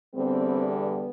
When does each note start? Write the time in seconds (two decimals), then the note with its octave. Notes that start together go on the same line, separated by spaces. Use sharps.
0.15 E2 D3 G3 B3 C4
0.75 B3